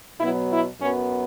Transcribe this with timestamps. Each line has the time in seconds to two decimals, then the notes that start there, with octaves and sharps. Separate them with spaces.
0.19 B2 F#3 B3 E4
0.51 E4
0.80 F#2 F#3 B3 C#4